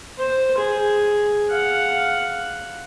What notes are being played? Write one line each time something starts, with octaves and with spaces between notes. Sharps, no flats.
C5
G#4
F5 F#5